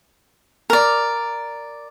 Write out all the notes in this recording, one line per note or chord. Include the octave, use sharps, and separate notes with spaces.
A#4 D5